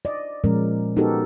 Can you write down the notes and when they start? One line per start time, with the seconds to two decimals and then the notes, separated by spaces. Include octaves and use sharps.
0.05 D5 D#5
0.44 A#2 F3 G#3 C#4 A#4
0.97 B3 D#4 F#4 G4 A4 A#4